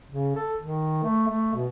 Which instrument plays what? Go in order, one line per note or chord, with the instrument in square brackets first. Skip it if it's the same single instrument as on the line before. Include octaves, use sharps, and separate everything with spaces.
[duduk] C#3
A4
D#3
A3
A3
B2